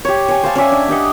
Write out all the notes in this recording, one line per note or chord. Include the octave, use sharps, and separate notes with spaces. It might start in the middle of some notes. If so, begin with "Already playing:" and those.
G4 C#5
C#5 G#5
C5 F5 A5
C#4 D5 E5 G#5
D4
D4 G4 D#5 F#5